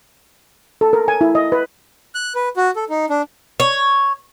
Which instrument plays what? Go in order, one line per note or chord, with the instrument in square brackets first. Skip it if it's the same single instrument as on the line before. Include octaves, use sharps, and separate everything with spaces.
[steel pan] A4
A#4
G#5
E4
D#5
B4
[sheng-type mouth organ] F#6
B4
F#4
A4
D#4
D4
[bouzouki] C#5